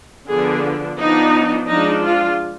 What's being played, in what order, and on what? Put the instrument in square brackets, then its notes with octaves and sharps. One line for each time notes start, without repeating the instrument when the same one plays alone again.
[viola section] D3 F3 B3 D4 G#4
F3 B3 D4 D#4
F3 G#3 D4 D#4
F4